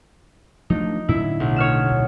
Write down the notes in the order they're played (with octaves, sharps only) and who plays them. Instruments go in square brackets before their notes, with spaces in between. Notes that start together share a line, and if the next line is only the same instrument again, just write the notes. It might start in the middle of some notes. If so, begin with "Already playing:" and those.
[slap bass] F3 A3 D4 [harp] D#4
[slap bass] A2 D3 F#3 [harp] E4
[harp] B1
C#5 F6 E7
[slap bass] D1